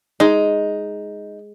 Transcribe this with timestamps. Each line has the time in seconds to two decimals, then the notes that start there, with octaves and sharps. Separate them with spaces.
0.20 G#3 D#4